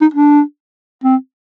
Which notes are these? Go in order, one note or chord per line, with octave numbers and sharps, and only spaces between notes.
D#4
D4
C4